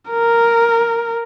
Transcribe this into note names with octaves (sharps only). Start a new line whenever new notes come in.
A#4